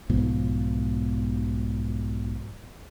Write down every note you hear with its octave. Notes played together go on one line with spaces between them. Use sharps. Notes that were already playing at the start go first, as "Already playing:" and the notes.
B1 G#2 B2 F3